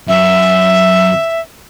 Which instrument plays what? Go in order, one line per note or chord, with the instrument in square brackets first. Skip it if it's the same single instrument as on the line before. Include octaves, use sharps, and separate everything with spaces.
[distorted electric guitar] F#2 [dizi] E5